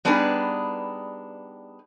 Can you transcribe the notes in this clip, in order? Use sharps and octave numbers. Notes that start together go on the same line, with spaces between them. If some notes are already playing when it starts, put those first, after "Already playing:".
G3 B3 D4 D#4 G#4 B4